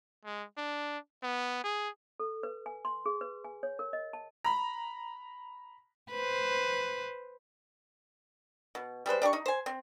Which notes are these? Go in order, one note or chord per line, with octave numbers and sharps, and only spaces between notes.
G#3
D4
B3
G#4
A4
B4
G#5
C6
G#4
B4
G#5
C#5
A#4
D#5
A5
A#5 B5
B4 C5
B2
G3 G#3 B4 C5
D4 G4 A5 C#6
D#4
C5 G#5
C4